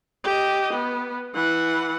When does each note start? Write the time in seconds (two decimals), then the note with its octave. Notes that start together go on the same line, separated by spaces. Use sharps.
0.24 G4 D#5
0.73 B3
1.34 E3 F#5